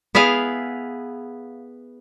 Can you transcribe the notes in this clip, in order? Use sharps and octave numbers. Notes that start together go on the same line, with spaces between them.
B3 E4 G#4 F5